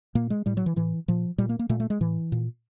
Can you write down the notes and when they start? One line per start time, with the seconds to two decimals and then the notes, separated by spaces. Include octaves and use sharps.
0.15 A#2 A#3
0.30 G#3
0.46 A2 G3
0.57 F#3
0.66 E3
0.76 A2 E3
1.08 A#2 F3
1.38 A#2 G3
1.49 A#3
1.59 A#3
1.69 A#2 A3
1.80 A3
1.90 G#3
2.01 A2 E3
2.32 A#2